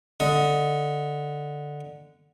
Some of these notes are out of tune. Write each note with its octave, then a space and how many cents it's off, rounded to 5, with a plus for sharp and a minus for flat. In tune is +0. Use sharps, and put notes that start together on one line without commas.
D3 +0 D#5 +10